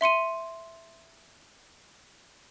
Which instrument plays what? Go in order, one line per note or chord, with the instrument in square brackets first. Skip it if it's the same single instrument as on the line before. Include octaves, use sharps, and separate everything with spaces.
[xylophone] E5 C6 C#7 D#7